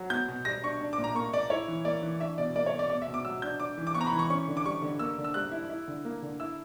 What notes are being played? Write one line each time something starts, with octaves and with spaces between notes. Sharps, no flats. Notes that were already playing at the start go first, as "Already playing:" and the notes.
Already playing: F#3
B3 G6
B2
G3 A#6
D4 C#6
D4
D6
A#2
A#5
A#3 C#6
A#2 D5
E4 C#5
E3
A#3 D5
E3
D4 E5
B2 D5
A#3 D5
C#5
B2
D5
B3 D5
E5
B2
D6
F#3 E6
D4 G6
D4 D6
E3
D6
B3 C#6
A#5
B5
E3
C#6
C#4 C#6
D3
D6
G3 C#6
D3
A#3 E6
D3
E6
G3 F#6
E4
E4
D3
A#3
D3
E4 E6